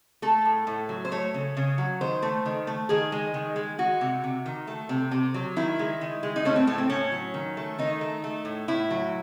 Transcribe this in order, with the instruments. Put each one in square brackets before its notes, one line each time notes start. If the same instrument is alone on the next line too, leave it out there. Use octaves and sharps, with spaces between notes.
[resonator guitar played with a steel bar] A3 A4
A2
A2
F#3
C5
A3 C#5
C#3
C#3
F#3
D#3 C5
A3
D#3
A3
D#3 G#4
G#3
D#3
G#3
G#3 F#4
C3
C3
D#3
A3
C3
C3
F#3
D#3 E4
G#3
D#3
G#3
D#4
A3 C#4
C4
A2 A3
C4
A2 C#4
F#3
D#3
A3
D#3 D#4
A3
A3
A2
A2 E4
F#3